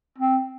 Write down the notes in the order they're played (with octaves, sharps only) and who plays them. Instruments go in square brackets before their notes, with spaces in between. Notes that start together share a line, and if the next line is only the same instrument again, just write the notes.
[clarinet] C4